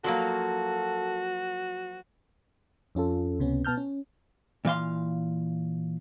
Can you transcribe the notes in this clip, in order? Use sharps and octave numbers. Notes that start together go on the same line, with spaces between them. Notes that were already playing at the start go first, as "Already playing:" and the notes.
F3 F#3 A#3 F#4 A4
F2 C#4 F4 A4
C#2 C3 B3 C#4
B2 B3 A5 F6 G6
C#4
A#2 E3 F5 C6